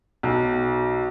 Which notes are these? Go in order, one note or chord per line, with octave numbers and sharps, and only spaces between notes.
B1